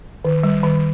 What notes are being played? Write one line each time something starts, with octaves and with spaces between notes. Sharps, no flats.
D#3
G3
D#3